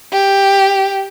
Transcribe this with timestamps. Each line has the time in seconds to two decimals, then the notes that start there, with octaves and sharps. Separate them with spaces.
0.13 G4